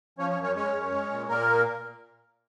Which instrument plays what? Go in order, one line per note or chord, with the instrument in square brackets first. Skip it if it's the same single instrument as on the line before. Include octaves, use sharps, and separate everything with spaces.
[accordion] F3 C#4 C#5
C#4 C#5
F#2
C#4 C#5
G#3 C#4 C#5
F#2
G#3
A#2
A#2 A#3 A#4